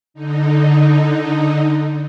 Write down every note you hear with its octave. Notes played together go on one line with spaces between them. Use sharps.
D3 D#4